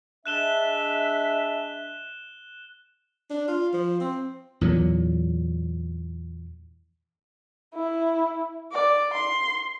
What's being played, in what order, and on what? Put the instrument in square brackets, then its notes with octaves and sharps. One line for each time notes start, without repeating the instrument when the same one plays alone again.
[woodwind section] G#3 D4 E5 [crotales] F#6 E7 G7
[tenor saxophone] D4
F4
F3
C4
[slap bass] E2 A#2 F#3
[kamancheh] E4
D5
C6